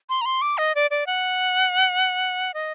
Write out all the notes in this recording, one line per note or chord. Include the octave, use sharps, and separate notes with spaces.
C6
A#5
C6
D6
D#5
D5
D5
F#5
D#5